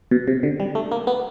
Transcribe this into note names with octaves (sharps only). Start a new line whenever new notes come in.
B2
C3
D3
G3
A3
A#3
B3